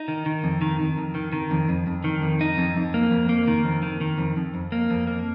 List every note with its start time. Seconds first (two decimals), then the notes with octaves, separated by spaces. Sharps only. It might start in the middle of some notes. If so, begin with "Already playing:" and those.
Already playing: D#4
0.08 D#3
0.26 D#3
0.44 F2
0.62 D#3
0.80 D#3
0.98 F2
1.15 D#3
1.33 D#3
1.51 F2
1.69 F2
1.87 F2
2.04 D#3
2.22 F2
2.41 D#4
2.58 F2
2.76 F2
2.94 A#3
3.11 F2
3.29 A#3
3.48 D#3
3.65 F2
3.83 D#3
4.01 D#3
4.18 F2
4.37 F2
4.55 F2
4.72 A#3
4.91 F2
5.07 A#3